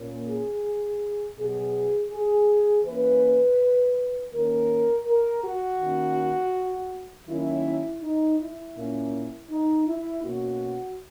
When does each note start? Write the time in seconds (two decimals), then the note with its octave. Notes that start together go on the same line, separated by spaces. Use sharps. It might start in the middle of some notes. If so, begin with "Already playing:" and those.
Already playing: A#2 A#3 C#4
0.26 G#4
1.37 B2 F#3 B3 G#4
2.12 G#4
2.85 E3 A#3 C#4 B4
4.32 D#3 A#3 C#4 A#4
5.06 A#4
5.43 F#4
5.81 D#3 A#3 C#4
7.28 D#3 F#3 A#3 C#4 E4
8.02 D#4
8.39 E4
8.76 A#2 A#3 C#4
9.50 D#4
9.87 E4
10.23 B2 A#3 C#4 F#4